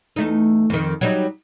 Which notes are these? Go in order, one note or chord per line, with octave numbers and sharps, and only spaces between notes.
E2 A3 D#4
F2 D#3
F#3 G3 D#4